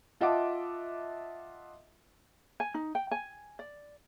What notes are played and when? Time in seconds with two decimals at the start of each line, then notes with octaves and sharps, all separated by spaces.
0.21 F4 D#5 E5 F#5 A5 D6
2.60 G#5
2.74 D#4
2.95 G5
3.11 G#5
3.59 D5